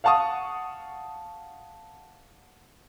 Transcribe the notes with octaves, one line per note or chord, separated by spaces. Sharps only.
F5 F#5 A5 C#6 D#6